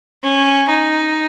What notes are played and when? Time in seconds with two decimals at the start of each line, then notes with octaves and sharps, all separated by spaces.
0.23 C#4
0.69 D#4